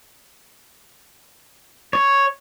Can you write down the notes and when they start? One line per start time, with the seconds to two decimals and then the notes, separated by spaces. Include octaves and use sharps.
1.93 C#5